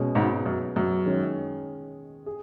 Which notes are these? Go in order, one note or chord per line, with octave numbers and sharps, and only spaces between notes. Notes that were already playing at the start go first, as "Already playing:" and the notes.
Already playing: B2 G#3 C#4
G#1 G#2
F#2
F#2
D#3 G#3 C#4
G#4